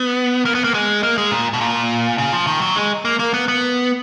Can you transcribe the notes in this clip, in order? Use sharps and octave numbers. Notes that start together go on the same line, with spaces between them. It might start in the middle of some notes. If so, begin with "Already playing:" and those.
Already playing: B3
A#3
B3
A#3
G#3
A#3
G#3
A#2
B2
A#2
C#3
F3
D#3
F#3
G#3
A#3
A#3
B3
B3